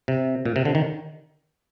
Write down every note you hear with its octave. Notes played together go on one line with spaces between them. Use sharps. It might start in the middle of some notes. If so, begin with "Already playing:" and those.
C3
A#2
C3
D3
D#3